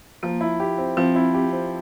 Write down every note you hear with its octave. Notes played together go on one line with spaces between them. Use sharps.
F3 A#3
E4
G4
C4
F3 C4
E4
G4
C4